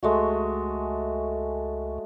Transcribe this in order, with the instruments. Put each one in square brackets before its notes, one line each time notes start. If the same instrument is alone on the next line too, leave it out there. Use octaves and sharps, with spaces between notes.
[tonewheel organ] C#2 [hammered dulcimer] G#3 A3 F#4